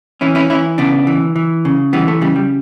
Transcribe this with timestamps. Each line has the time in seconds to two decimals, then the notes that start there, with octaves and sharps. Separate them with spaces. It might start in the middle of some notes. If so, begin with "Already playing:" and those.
0.21 E3 C#4 E4
0.35 C#4 E4
0.50 E3 C#4 E4
0.78 C#3 B3 D4
1.07 E3
1.36 E3
1.65 C#3
1.93 E3 G3 B3
2.08 A3
2.21 C#3 G3
2.36 G3